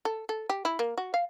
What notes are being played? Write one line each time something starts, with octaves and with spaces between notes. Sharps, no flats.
A4
A4
G4
E4
A#3
F#4
F5